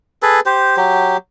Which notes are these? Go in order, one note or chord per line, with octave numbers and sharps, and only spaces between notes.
G#4 A4 B4
G4 C5
F#3 G4